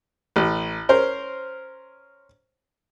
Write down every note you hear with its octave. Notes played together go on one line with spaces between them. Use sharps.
A1
C#4 A#4 C5